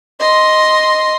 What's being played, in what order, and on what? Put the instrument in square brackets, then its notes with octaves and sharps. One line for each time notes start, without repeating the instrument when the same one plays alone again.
[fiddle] D#5 C6